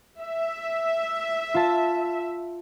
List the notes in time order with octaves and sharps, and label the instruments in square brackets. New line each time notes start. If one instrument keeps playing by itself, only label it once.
[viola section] E5
[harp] F4 A5